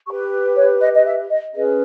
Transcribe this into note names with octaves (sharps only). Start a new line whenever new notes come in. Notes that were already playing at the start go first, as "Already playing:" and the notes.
G4 B4 C#6
C#5
D#5
D#5
E5
D#5
C#4 G#4 B4 D#5